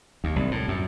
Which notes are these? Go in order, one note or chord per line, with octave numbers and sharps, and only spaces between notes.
D#2
C2
A2
F#2